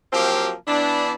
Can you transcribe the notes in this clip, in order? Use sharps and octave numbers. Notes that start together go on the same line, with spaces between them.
F3 F#3 A#3 C4 G4
E3 B3 D4